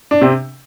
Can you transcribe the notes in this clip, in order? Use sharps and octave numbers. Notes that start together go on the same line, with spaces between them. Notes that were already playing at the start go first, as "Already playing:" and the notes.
D4
C3 C4